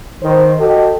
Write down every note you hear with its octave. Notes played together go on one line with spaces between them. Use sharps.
D#3 C5
F#4 G4 A4 D#5